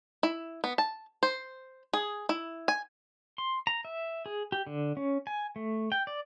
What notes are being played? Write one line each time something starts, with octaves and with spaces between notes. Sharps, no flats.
E4
B3
A5
C5
G#4
E4
G#5
C6
A#5
E5
G#4
G4
D3
C#4
G#5
A3
G5
D5